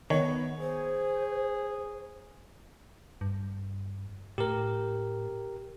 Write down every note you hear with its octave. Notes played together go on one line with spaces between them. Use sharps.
D#3 B3 C#5
G#4 C5
G2
A2 G4 A#4